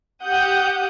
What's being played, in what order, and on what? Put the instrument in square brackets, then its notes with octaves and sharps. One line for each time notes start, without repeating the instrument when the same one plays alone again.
[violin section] G4 F#5 D#6 G6